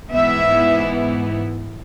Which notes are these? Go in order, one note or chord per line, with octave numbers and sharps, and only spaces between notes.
G#2 E3 B3 E4 E5